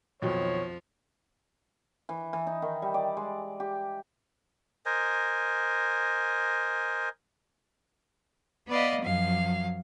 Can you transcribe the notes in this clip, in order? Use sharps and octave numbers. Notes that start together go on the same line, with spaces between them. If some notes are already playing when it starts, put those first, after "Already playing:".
B1 F2 D#3 F3 F#3 C#5
E3
E3
D#4
D#3
G3
D5
G#3
G4
A#4 C5 D#5 G#5
B3 B4 D5 D#5 F5
F#2 F3 F#3 F5